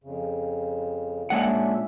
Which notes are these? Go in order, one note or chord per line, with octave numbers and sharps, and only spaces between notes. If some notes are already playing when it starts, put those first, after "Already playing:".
F2 C#3
A#2 G#3 C#4 D4 E5 F#5